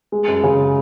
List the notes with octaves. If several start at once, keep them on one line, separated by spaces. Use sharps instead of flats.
G#3
F#2
C#3